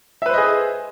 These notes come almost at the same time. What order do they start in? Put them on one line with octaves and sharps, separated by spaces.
E5 B4 C5 D#5 G#4